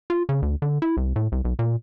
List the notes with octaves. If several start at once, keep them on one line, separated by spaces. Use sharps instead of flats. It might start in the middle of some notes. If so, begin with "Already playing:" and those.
F4
C#3
D2
D3
E4
C2
A2
C2
B1
A#2